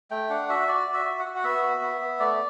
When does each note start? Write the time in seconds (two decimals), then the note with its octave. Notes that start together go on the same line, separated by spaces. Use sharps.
0.11 A3 G5
0.29 D4 F#5
0.49 F#4 E5
0.68 F#4 D5
0.87 F#4
0.94 E5
1.05 F#4
1.19 F#5
1.25 F#4
1.36 F#5
1.44 B3 E5
1.63 F#4
1.81 B3
2.01 B3
2.20 A3 D5